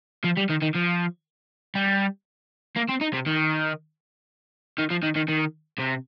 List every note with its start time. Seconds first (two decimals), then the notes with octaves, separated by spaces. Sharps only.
0.24 F3
0.37 G3
0.49 D#3
0.62 D#3
0.75 F3
1.75 G3
2.76 A#3
2.89 C4
3.01 D#4
3.13 C3
3.26 D#3
4.78 D#3
4.90 F3
5.03 D#3
5.16 D#3
5.28 D#3
5.78 C3